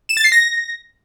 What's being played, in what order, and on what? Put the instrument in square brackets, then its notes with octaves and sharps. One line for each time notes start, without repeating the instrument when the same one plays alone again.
[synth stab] E7
A6
C7
A#6